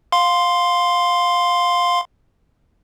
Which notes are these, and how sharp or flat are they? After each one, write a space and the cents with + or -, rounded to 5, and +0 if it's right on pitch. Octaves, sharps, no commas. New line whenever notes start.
F5 +15 C6 -5